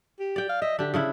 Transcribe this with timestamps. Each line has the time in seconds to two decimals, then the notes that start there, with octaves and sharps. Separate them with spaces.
0.20 G4
0.36 D5 G5
0.49 F5
0.62 D#5 E5
0.79 D3 D4 G4
0.94 C#3 D4 E4